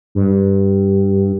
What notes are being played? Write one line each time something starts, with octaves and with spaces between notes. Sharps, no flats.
G2